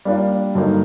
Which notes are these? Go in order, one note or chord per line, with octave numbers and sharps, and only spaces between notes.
G3 A#3 D4 F4
G2 D3 F#3 A#3 D#4